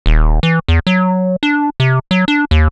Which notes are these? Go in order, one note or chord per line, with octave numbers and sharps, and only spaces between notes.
D#1
E3
E2
F#3
D4
C3
F#3
D4
D#2